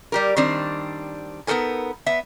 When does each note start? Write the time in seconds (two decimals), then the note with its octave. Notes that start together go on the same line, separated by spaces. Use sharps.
0.12 G3 G4 A#4
0.37 D#3 G3 C4 D4
1.47 B3 D#4 A4 A#4 G#5
2.06 B3 E5